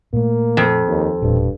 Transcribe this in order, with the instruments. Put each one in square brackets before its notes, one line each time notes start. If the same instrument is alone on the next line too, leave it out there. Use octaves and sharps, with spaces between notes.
[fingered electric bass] A#2 A3 [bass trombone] A#3
[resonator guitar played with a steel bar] F2
[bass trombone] D#2
[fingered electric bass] E1 A#2 [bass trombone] G2